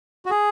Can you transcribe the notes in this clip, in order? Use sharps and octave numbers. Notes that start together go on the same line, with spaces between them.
F#4
G#4